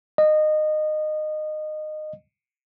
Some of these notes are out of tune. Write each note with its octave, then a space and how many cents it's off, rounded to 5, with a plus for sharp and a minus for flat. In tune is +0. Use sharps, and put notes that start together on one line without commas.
D#5 -20